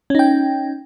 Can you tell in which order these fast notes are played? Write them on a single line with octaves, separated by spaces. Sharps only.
C#4 D#4 G5